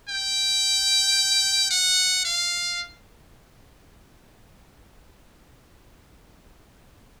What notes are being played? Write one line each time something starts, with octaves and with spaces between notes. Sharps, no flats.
G5
F#5
F5